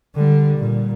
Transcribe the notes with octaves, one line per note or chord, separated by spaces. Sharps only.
D3 G3
A#2